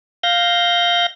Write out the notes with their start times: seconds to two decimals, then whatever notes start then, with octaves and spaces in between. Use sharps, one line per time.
0.23 F5 G6 A#6